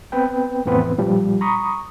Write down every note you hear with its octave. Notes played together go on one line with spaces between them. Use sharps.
B3 C4 B4 G5
F2 A2 E3 B3 C4 B4
A#2 F3 G3
A#5 B5 C#6 D#6